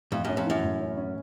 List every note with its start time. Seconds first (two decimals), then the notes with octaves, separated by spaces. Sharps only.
0.12 F2 A2
0.25 F#2 C#4
0.37 F2
0.46 F#2 E3
0.64 A2
0.80 C#4
0.97 C#4